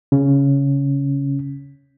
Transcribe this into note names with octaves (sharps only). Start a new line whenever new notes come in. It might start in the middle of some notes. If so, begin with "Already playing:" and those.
C#3 C#4